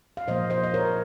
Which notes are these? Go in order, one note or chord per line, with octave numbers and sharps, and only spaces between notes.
F5
A#2 F3 A#3 C5 D#5
C5 D#5
D#5
A#4 C#5